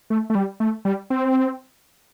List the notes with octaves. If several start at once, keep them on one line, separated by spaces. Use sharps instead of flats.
A3
A3
G3
A3
G3
C4